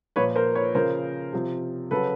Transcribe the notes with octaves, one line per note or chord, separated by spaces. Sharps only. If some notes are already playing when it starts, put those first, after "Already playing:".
A#2 F3 B4 C#5
A#4 C5
B4 C#5
C#3 F3 A#4 C5
C3 F3
C#3 F#3 A4 B4